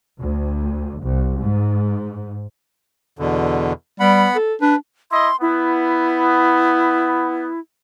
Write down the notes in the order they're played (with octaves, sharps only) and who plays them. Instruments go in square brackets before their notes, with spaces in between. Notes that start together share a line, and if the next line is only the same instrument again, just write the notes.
[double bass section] D2
C2
G#2
[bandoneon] E2 B2 D3
[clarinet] G3 [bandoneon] B3 F#5 B5
[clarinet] A4
[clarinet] D4 [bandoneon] B4
[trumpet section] E4 D#5 [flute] C6
[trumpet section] B3 [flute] E4